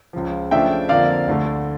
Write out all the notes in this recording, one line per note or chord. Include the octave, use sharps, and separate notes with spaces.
C#2 C#3 F3
C#3 F3 A3 D4 E5 G5
F2 D3 F3 A#3 D5 F5
D2 D3 A3